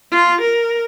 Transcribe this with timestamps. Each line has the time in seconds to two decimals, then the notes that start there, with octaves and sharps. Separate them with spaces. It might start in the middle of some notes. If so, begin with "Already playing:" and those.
0.11 F4
0.41 A#4